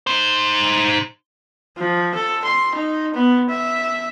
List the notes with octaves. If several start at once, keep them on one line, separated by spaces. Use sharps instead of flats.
D#4 C5
F3
A4
C6
D#4
B3
E5